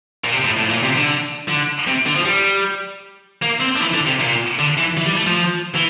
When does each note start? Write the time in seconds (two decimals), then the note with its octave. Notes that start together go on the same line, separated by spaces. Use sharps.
0.24 A#2
0.32 C3
0.44 A2
0.57 A2
0.70 A#2
0.84 C3
0.97 D3
1.48 D3
1.87 C3
2.06 D3
2.16 F3
2.25 G3
3.42 A#3
3.61 C4
3.76 D3
3.81 E3
3.94 D3
4.06 C3
4.20 A#2
4.59 D3
4.77 E3
4.97 E3
5.06 G3
5.17 A3
5.27 F3
5.75 E3